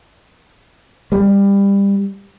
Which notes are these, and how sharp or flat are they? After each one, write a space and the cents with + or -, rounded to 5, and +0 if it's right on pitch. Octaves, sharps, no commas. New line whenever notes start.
G3 +25